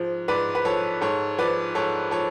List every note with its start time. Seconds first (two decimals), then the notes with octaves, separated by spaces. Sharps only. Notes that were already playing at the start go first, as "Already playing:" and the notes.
Already playing: G#2 F3
0.28 G#2 B4 D5
0.55 B4
0.65 F3 A4 C#5
1.01 G#2 A4 C#5
1.38 F3 B4 D5
1.75 G#2 A4 C#5
2.11 F3 A4 C#5